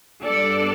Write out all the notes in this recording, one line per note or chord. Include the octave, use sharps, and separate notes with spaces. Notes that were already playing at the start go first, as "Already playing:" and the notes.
G2 G3 B3 D4 A4 D5